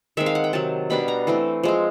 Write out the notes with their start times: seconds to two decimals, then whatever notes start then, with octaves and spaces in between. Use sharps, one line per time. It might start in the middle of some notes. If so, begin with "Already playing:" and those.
0.17 D#3 G#3 C4 E5
0.26 F5
0.35 F#5
0.44 G5
0.53 C3 D#3 F#3 A5
0.90 B2 G3 B3 D4 B5
1.08 A#5
1.27 E3 A3 C4
1.63 F3 G#3 C4